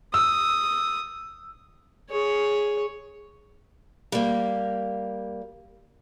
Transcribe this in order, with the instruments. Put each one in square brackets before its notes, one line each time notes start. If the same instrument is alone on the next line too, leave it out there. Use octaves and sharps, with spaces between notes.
[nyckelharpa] D#6 [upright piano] E6
[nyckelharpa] G#4 C#5
[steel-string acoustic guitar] G3 A#3